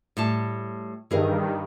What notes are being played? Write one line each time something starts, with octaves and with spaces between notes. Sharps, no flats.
A2 G3 A5
G2 D#3 E3 G#4 A#4